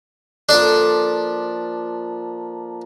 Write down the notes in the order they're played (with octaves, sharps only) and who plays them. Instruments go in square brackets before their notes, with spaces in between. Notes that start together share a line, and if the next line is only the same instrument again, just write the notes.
[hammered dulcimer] F3 A#3 A4 [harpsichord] D4 D5